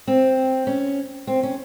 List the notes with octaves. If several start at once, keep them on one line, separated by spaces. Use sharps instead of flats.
C4
C#4
C4
C#4